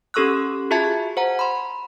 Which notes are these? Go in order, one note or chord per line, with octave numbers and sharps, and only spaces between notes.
C#4 G4 A4 C#6 E6 F#6
F4 F#4 G#4 E5 A5 G#6
C5 F#5 A#5
B5 C6